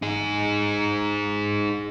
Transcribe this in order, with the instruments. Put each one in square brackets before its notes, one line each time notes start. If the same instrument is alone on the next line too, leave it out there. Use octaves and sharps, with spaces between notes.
[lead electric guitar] D#4 G#4